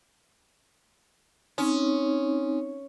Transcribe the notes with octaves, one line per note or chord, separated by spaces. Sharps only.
C4 C#4 D#4